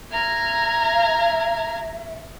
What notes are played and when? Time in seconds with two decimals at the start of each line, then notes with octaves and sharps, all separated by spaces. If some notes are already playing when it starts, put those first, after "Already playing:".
0.12 E5 A#5 F6 G#6